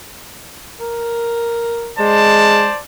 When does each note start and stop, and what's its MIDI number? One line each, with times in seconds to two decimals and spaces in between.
0.80 1.94 70
1.99 2.68 56
1.99 2.79 72
1.99 2.79 74
1.99 2.79 81